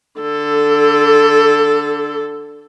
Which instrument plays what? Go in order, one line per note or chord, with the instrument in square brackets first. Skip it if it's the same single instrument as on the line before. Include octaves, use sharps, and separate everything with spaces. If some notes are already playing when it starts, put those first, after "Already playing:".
[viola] D3 A4